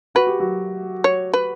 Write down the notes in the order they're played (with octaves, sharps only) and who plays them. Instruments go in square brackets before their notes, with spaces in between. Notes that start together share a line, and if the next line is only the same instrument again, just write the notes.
[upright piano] F#4 [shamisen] B4
[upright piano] G4
F#3 F#4
[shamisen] C#5
B4